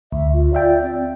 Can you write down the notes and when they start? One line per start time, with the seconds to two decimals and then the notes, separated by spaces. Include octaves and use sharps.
0.12 D2 E5
0.33 F4
0.53 F4 D5 E5 G5
0.82 C4